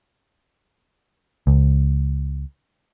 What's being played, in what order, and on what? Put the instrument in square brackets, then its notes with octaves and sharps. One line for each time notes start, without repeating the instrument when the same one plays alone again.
[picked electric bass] C#2